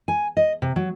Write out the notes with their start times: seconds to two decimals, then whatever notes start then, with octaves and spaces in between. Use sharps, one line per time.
0.08 G#5
0.37 D#5
0.62 C3
0.76 F#3